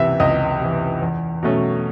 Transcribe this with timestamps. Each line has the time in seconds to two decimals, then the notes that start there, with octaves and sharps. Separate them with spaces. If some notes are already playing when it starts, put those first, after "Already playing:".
Already playing: C#2 C3 E3 E5
0.20 C#2 D#5
0.61 C3 E3
1.01 E2
1.43 B2 F#3 A3 C#4